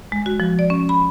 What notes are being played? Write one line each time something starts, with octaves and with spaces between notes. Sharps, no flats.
G#3
F#4
F3
D5
C#4
B5